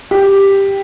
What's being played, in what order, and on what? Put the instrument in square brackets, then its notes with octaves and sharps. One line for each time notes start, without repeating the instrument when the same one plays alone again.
[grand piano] G4